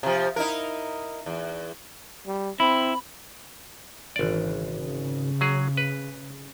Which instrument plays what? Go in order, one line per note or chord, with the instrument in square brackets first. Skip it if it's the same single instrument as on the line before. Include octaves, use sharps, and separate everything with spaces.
[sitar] C3 F3
D#4 E4 A#4
E2
[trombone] G3
[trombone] C4 [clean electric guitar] E4 [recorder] B5
[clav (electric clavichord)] G#1 D5 [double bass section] C#3 E3
[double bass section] C#3
[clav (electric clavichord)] F#3 G#4
B4